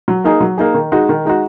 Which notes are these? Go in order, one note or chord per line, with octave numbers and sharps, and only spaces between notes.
F#3
A#3 D#4 G#4
F#3
A#3 D#4 G#4
D#3
G#3 D#4 F#4
D#3
G#3 D#4 F#4